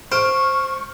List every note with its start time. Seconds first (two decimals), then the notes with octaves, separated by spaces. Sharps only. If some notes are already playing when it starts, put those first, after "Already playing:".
0.12 C5 C#6 F6 D7